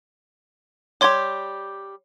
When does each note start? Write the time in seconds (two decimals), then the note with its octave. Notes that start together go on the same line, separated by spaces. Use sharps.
1.01 G3 G4 C#5 C6 G#6